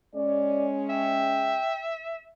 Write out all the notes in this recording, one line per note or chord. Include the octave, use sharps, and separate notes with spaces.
G#3 C#4 D5
E5 G5